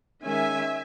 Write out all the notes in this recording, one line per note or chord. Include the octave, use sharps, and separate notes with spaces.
D#3 G#3 C#4 E5 G#5